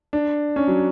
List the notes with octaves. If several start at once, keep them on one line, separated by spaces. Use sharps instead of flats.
D4
C#4
F#3